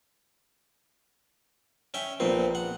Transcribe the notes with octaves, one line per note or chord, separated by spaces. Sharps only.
C#4 E5 G5
A#1 A#2 F3 B3 C4
F#5